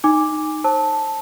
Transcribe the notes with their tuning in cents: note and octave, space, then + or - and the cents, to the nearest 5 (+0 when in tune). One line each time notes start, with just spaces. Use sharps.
D#4 -10 G#5 -15 D6 +0
C5 +30 A5 +0 E6 -35